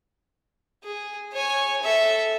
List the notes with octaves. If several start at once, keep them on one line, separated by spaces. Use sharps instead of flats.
G#4
C#5 G#5
A4 E5